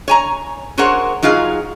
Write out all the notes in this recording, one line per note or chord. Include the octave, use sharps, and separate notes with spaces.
C#5 G#5 A#5
F#4 G#4 A#4 C5 C#5 F#5
F#3 D#4 F4 G#4 F5